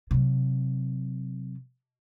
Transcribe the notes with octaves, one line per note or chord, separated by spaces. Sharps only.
C3 F#3